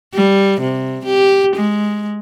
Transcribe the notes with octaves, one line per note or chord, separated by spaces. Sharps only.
G3
C3
G4
G#3